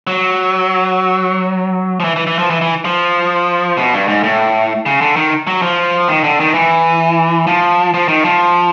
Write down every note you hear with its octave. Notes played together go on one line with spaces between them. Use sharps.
F#3
F3
E3
E3
E3
F3
E3
E3
F3
B2
G2
G#2
A2
C#3
D3
D#3
F#3
F3
D#3
D3
D#3
E3
F3
F3
D#3
F3